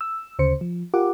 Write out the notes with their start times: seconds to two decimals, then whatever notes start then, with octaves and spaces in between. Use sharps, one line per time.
0.01 E6
0.39 D2 C#3 C5 C#7
0.61 F3
0.94 F4 G4 A#4 F#5 D6